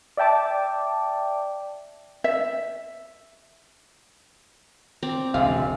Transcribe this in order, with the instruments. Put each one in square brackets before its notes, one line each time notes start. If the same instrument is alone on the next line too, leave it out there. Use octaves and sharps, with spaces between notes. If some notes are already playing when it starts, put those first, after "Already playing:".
[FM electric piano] D5 E5 G5 A5 D6
[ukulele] E5
[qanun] C4 D5 A#5
[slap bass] E1 C#2 D3 [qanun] G#3 [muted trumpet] E5 [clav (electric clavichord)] F5